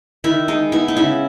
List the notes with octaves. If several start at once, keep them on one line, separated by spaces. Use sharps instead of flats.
D#3 E4
G#3 D#4
B3 E4
D#4
C#3 E4